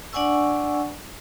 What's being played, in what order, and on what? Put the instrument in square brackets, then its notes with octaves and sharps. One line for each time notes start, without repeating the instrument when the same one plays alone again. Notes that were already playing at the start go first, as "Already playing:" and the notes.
[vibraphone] D4 D5 F#5 G#5 C#6 E6